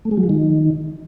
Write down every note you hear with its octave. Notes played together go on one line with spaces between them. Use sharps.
A3
G#3
F#3
F3
D#3